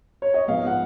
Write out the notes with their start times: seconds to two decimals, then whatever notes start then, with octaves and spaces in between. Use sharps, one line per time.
0.22 C#5
0.34 D#5
0.48 G#2 F3 G#3 B3 F5
0.67 F#5